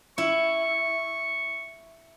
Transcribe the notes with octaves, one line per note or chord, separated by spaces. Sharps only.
E4 C#6